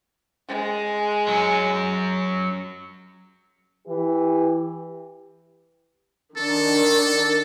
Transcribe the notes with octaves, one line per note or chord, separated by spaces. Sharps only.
G#3
F#3 C#4
E3 E4 G4 B4
D#3 D4 A4